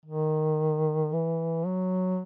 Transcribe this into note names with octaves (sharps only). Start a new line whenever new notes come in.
D#3
E3
F#3